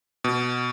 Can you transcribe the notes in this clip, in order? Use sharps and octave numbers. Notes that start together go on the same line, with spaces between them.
B2